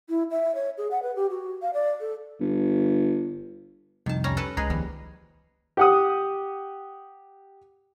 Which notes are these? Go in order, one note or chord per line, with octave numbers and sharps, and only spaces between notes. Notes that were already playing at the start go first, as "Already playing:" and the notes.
E4
E5
C#5
G#4
F#5
B4
G4
F#4
F5
D5
A4
G1
C2 F2 D#3 A5
G3 C#4 A#5
A4 B4 A5
C#2 G#3 G#4 B4 A#5
D#2 F3 G3
G4 F#5 D#6